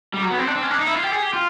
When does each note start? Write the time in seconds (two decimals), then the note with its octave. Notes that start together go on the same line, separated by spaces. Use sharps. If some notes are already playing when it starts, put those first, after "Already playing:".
0.14 G3
0.22 F#3
0.30 B3
0.39 C4
0.47 D4
0.55 C4
0.63 C#4
0.71 D4
0.78 D#4
0.87 E4
0.95 F4
1.03 G4
1.12 G#4
1.22 G4
1.33 F4